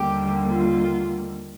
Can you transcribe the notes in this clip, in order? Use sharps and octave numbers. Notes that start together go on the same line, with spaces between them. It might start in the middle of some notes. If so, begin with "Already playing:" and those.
Already playing: D#2 D3 G3 A#3 G4
F4